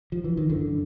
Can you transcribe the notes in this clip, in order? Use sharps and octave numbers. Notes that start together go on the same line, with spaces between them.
F3
E3
D#3
F#2 D3